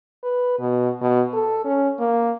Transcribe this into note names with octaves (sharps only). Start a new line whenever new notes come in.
B4
B2
B2
A4
C#4
A#3